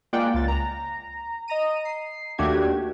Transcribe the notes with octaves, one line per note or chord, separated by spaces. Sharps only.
G#3 A#3 F4 D5 F#5 G5
C#2 A6
A#5
D#5 A#5 D#7
C7
D#2 A3 D4 F#4 G4 G#6